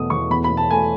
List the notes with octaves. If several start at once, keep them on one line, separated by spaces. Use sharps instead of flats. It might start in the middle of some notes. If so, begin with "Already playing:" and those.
Already playing: E2 B2 A3 D#6
E2 C#6
E2 B5
B5
B2
A5
A3 G#5